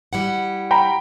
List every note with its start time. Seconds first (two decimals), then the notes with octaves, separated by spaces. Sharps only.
0.13 G3 E4 F#5
0.71 G5 A#5 B5